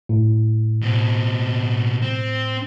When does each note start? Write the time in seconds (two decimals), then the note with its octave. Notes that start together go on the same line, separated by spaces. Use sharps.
0.09 A2
0.82 B2 C4
2.02 C4